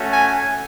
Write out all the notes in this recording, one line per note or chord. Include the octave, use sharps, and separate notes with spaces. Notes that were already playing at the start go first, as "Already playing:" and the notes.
Already playing: A3 C#4 F#4
G#5